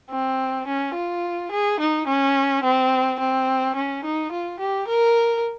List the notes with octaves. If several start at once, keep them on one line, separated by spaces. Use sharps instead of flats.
C4
C#4
F4
G#4
D#4
C#4
C4
C4
C#4
D#4
F4
G4
A#4